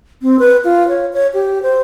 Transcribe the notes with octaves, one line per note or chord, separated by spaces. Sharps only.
C4
B4
F4
C#5
C#5
G4
C5